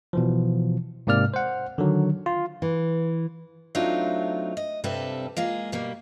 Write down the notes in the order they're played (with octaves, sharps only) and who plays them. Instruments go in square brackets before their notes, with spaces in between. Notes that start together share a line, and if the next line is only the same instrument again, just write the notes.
[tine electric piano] B2 E3 F3
G#2 C3 A#3 D5 F6
C5 F#5
D3 D#3 F#3
F4
[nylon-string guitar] E3
[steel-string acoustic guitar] F#3 A3 C4 D4 D#4 F4
D#5
G2 C3 G3 C4 A4 B4
G#3 A#3 F4 G#4
B2 G3 A#3